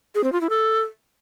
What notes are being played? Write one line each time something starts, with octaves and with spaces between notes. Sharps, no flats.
G#4
C4
F4
E4
A4